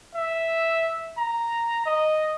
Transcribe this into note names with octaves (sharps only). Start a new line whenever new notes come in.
E5
A#5
D#5